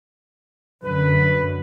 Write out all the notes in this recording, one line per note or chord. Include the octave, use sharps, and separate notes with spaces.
F#2 D3 B4